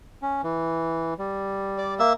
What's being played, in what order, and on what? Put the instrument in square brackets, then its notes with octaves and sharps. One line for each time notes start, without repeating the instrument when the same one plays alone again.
[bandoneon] C#4
E3
G3
[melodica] D5
A#3 E5